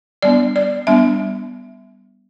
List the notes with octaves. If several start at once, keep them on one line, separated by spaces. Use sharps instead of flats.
G3 B3 D4 D5
D5
G3 B3 D4 E5